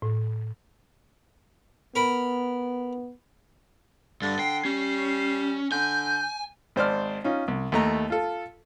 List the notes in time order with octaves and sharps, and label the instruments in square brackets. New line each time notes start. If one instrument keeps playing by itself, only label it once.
[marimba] A2
[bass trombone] B3 [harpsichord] A#4 B5
[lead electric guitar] G2 [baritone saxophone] D3 [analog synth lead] A6
[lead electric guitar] G5 [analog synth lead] C7
[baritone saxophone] G3 [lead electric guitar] C#4
[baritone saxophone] D3 [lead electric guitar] G#5 [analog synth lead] G6
[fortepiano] G#1 C5 D5 F6
C#4 D#4 F4
C2
D#2 A3 A#5
F4 A4